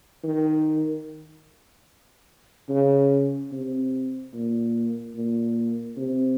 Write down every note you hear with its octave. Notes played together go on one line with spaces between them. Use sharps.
D#3
C#3
C3
A#2
A#2
C3